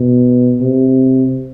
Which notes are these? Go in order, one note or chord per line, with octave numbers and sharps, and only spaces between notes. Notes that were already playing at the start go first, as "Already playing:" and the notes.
Already playing: B2
C3